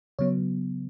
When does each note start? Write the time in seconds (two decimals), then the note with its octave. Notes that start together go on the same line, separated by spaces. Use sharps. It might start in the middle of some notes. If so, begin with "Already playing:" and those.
0.19 C#3 F#3 B3 C#5